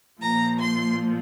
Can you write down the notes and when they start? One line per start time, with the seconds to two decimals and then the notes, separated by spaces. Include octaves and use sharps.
0.21 A#2 F3 A#5
0.58 C6